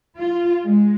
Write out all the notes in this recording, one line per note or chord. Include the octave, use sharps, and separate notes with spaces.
F4
G#3